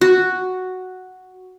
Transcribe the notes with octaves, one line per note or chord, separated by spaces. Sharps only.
F#4